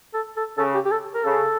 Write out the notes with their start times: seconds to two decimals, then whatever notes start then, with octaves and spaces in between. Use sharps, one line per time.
0.14 A4
0.36 A4
0.58 C#3 A4
0.75 G4
0.85 G4
0.91 A4
1.14 A#4
1.24 C#3 A4